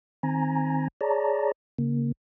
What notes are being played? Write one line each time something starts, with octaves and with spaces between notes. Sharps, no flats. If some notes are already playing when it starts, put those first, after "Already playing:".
D#3 C4 G#5 A#5
G#4 C#5 D5 A5 A#5
C#3 A#3